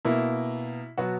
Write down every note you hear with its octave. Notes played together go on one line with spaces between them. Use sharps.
B2 A#3 E4
B2 F#3 B3 F#4